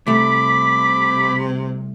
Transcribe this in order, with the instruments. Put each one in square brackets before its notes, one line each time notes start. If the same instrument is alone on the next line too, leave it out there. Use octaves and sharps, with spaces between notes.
[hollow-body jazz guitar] C2 A3 [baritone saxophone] C3 [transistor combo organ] B5 [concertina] D6